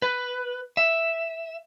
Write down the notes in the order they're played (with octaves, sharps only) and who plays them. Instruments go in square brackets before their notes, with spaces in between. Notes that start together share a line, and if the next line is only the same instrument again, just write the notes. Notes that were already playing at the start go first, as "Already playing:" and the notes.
[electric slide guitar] B4
E5